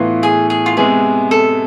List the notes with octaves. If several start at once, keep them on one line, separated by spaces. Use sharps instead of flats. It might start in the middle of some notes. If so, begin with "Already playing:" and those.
Already playing: A2 E3 B3 F4
G#4
G#4
F4
C3 G#3 B3 G#4
A4